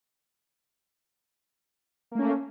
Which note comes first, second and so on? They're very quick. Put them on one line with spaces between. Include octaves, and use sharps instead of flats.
A#3 A3 C#4